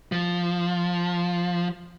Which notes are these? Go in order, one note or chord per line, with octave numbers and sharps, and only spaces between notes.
F3